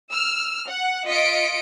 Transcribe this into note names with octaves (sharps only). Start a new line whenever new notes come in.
E6 F6
F#5
F4 D#5 B6 C#7 D7